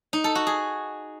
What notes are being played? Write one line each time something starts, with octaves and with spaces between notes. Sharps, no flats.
D#4
A4
F#4
G#4